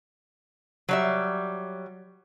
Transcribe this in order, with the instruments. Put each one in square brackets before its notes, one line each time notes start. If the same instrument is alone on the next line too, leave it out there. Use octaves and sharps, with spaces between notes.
[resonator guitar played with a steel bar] F#3 G3 E5